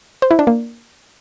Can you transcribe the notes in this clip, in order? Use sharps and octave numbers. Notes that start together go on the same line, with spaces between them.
C5
E4
D4
A#3